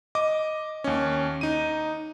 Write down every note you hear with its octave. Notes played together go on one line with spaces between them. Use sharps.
D#5 D6
D#2 C#4
D#4 D#7